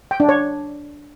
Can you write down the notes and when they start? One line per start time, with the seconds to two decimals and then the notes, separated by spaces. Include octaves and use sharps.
0.11 G5
0.20 D4
0.29 C#5